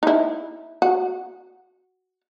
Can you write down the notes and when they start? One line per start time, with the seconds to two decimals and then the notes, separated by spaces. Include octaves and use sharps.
0.03 D#4 E4
0.82 F#4